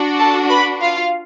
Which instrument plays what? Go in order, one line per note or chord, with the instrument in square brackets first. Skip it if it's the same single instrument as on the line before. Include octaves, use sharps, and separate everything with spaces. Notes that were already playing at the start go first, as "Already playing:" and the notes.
Already playing: [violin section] D4 F#4
A4 A5
B4 B5
F4 F5